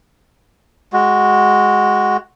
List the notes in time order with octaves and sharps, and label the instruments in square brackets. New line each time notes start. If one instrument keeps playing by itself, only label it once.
[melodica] G#3 F#4